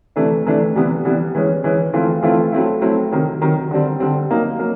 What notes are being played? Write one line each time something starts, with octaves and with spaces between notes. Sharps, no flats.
C3 E3 A3 D4
C3 E3 A3 D4
C3 E3 G3 B3
C3 E3 G3 B3
E3 G#3 C#4
E3 G#3 C#4
E3 A3 C4 F4
E3 A3 C4 F4
F#3 A3 C4 E4
F#3 A3 C4 E4
C3 D#3 F#3
C3 D#3 F#3
D3 G3 C4
D3 G3 C4
F#3 A#3 D#4
F#3 A#3